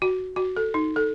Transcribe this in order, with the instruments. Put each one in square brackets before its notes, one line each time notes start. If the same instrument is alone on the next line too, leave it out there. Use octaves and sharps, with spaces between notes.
[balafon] F#4
F#4
A4
D#4
A4